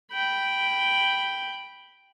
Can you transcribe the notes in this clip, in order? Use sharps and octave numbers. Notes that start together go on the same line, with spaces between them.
G5 B5